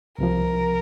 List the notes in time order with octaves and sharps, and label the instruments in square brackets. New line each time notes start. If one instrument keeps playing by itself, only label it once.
[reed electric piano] C2 C3 F3 [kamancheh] A#4